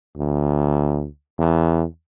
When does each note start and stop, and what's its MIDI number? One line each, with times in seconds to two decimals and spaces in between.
0.17 1.06 38
1.38 1.84 40